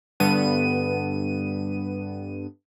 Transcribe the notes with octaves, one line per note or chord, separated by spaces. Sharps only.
G2 D3 B3 D#7